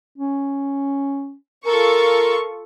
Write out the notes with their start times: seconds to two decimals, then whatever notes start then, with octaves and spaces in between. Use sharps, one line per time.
0.18 C#4
1.66 F4 A4 A#4 C#6